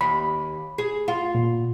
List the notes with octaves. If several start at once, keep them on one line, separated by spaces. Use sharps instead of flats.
D#2 B5
G#4
F4
A#2